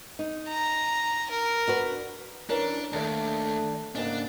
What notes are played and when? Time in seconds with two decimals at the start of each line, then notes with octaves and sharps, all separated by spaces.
0.19 D#4
0.49 A#5
1.30 A#4
1.68 D4 F#4 B4
2.50 E3 C#4 D4 A#4
2.93 D#2 A3 D4 D5
3.95 G#2 C#3 A#3 D4 F#4